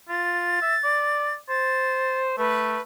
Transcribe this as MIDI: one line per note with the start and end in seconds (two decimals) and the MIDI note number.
0.09 0.61 65
0.09 1.33 93
0.62 0.75 76
0.84 1.36 74
1.49 2.34 72
1.49 2.19 93
2.38 2.78 57
2.38 2.81 71